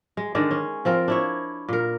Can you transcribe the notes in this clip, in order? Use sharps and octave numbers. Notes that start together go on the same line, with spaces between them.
G#3
D3 D#3 G#3 D4
C#4
F3 C4 A#4
D4 E4 C#5
A#2 A#4